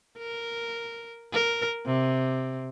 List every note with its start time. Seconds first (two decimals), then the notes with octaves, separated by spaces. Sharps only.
0.18 A#4
1.32 A#4
1.86 C3